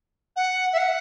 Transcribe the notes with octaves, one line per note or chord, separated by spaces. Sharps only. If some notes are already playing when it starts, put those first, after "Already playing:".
F#5
E5
F#5